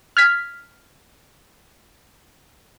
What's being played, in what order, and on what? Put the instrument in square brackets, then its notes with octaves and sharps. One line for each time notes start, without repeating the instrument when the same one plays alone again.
[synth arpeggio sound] F6 G#6 B6